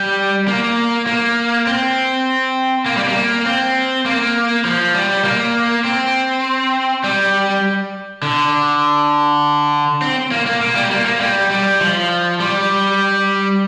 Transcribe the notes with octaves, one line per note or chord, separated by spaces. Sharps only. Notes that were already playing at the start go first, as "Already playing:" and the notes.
Already playing: G3
A#3
A#3
C4
A#3
G3
A#3
C4
A#3
F3
G3
A#3
C4
G3
D3
C4
A#3
A#3
A#3
G3
A#3
A#3
G3
G3
F3
G3